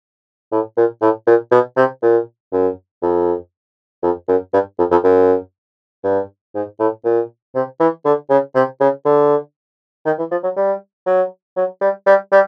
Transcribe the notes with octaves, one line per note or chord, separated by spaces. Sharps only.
A2
A#2
A2
A#2
B2
C3
A#2
F#2
F2
F2
F#2
G2
F2
F2
F#2
G2
G#2
A2
A#2
C3
E3
D3
C#3
C3
C#3
D3
D#3
E3
F3
F#3
G3
F#3
F#3
G3
G3
G3